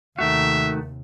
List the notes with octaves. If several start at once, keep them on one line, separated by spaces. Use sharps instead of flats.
D#2 C3 D#3 A3 F#4 E5